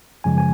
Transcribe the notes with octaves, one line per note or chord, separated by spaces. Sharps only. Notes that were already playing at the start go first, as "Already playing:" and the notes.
F#2 C#3 F3 G#3 G#5
G#5